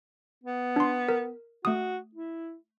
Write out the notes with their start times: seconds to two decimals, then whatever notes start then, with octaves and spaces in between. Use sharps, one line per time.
0.44 B3
0.76 D4 C6
1.09 A#4
1.65 A3 F#4 D#6
2.15 E4